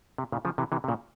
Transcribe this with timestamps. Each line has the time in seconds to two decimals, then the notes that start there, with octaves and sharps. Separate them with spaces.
0.18 C3
0.32 A#2 C#3
0.45 C#3 F3
0.58 C3 E3
0.72 C3 E3
0.84 C3
0.88 A#2 C#3